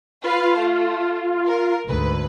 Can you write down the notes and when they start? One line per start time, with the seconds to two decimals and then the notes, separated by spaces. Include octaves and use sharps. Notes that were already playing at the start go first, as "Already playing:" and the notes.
0.24 F4 B4 F5
0.58 A3
1.48 A#4
1.87 D2 G#2 B4